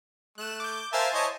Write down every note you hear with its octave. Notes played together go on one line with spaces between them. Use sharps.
A3 F#6 E7
D6 G6
A#4 C5 E5 F5 G#5 A5
E4 C#5 D#5